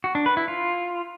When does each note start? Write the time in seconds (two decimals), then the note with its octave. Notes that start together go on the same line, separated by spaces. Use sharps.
0.04 F#4
0.15 D4
0.26 B4
0.37 E4
0.48 F4